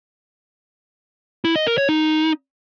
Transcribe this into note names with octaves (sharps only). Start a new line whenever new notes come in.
E4
D#5
A#4
C#5
D#4